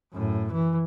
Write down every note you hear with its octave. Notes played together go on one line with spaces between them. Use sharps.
F#2 A2
E3